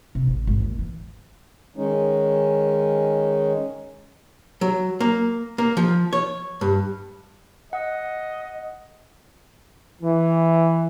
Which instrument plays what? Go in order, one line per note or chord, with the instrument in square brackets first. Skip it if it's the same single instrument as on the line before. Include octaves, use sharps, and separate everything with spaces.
[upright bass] C3
A1
G#1
D#2
E3
[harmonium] D#3 G#3 C#4 D#4
[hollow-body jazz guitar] F#3
A#3
A#3
F3
C#5
G2
[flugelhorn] D#5 [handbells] F#5
[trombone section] E3